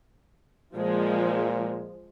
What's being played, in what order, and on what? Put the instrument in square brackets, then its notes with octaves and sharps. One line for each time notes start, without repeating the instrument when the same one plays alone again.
[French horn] A#2 [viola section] F3 G#3